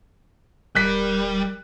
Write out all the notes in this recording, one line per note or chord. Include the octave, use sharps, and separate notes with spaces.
D1 G3 A#4 F#6 B6